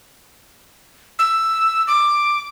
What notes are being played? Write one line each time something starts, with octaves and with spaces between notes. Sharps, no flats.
E6
D6